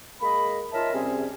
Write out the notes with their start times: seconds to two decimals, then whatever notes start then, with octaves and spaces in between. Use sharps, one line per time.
0.21 G#3 A#3 D#5 B5
0.73 C#4 D#4 F4 A#4 E5 A5
0.93 C3 G3 C4 C#4 G#4